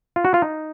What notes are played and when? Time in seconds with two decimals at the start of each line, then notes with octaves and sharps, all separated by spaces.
0.16 F4
0.25 F#4
0.34 F4
0.42 D#4